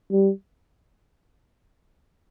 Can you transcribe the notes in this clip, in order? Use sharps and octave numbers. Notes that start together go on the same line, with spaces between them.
G3